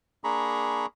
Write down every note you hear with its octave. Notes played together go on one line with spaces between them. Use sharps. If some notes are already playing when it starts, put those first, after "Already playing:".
A#3 D4 G#4 A#5 B5 C#6